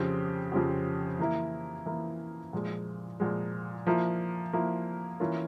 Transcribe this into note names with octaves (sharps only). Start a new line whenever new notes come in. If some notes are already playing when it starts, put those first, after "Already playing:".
Already playing: F2 C#3 F3 C4 G4
F2 C#3 F3 C4 G4
E3 A#3 E4
E3 A#3 E4
A#2 F3 G#3
A#2 F3 G#3
F3 A#3 E4
F3 A#3 E4
E3 A#3 C#4 F4 A#4